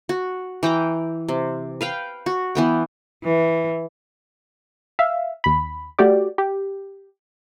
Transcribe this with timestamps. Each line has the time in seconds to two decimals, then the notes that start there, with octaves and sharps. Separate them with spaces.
0.09 F#4
0.63 E3 G5 A#5 D6
1.29 C3
1.81 B4 F5 G5
2.26 F#4
2.55 E3 B3 G5
3.24 E3
4.99 E5 F5
5.44 D#2 B5
5.99 A3 F#4 G4 D5
6.38 G4